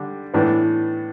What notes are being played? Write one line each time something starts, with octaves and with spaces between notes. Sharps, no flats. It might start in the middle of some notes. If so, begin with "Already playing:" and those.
Already playing: D3 G3 D4
A2 E3 B3 D4